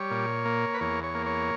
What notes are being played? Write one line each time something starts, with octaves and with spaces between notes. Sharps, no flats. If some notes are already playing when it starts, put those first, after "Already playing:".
Already playing: G3 C#5
A#2
A#3
B4
E2 C#5
C#5
A#3
C#5